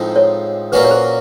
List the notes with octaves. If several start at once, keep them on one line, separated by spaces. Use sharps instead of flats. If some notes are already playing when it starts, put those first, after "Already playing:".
Already playing: A2 F3 G#3 C4 D#4
C#5
A#2 F#3 A#3 C#4 F#4 B4
C#5
C5